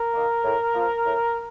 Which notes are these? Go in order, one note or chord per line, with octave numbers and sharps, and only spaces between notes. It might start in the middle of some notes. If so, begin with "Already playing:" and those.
Already playing: A#4
D#3 A#3
A2
F3 A#3
A2